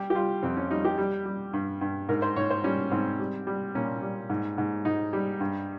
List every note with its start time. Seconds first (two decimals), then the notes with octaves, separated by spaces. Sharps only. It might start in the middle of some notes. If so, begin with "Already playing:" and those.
Already playing: G3 G4
0.10 G4
0.15 G3 F4
0.43 F2 C4
0.57 C#4
0.70 G3 D#4
0.85 G4
0.98 G3
1.26 G3
1.53 G2
1.81 G2
2.09 G#2 A#4
2.22 C5
2.36 G#2 C#5
2.50 C5
2.64 G3 C#4
2.91 G#2 C4
3.19 G3
3.47 G3
3.75 A#2 C#4
4.02 G3
4.30 G#2
4.58 G#2
4.85 G#2 D#4
5.13 G3
5.40 G2